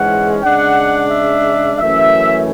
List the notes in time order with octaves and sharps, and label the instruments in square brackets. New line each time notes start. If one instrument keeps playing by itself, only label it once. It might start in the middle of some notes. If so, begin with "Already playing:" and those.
Already playing: [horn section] G#2 E3 G#3 C#4 F#5
C#3 G#3 D4 F#5
E5
F#2 E3 A3 C#4 E5